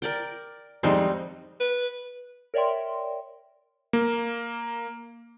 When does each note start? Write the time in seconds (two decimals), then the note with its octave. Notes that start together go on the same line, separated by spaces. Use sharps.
0.02 A#4 D5 G5
0.83 F2 G3 G#3 C4 D#4
1.60 B4
2.54 A#4 C#5 D5 E5 G5 C6
3.93 A#3